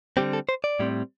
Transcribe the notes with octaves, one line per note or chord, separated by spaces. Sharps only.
D3 G3 C4 G4
A4
C5
D5
A2 G3 C4